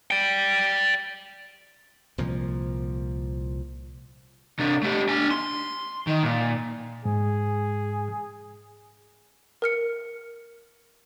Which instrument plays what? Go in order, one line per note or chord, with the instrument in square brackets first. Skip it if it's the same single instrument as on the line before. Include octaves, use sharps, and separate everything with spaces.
[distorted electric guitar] D5 G5
[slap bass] C2 A#2 F3
[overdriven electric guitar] C3 D4
A3 G4
D4 G#5
C6
D#3
A#2
[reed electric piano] G#2 [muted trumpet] G#4
[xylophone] A#4 F6 C#7